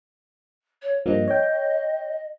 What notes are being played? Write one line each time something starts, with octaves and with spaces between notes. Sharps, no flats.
C#5
G2 F3 A#3 D#5
C#5 G5